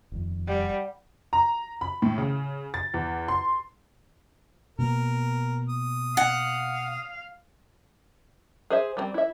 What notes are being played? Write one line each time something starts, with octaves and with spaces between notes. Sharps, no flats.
D#1 F2
G3 D5 F#5
A#5
B5
A2
C#3
A6
E2
C6
B2 A#3 B3 A#4
D#6
F5 F#5
G#4 C5 E5
G3 A3 C4
E4 E5